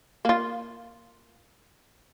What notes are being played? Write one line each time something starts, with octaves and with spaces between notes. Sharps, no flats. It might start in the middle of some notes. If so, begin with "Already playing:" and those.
A#3 F4